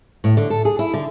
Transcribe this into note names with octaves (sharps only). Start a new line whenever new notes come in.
A2
D3
A4
G#4
E4
D3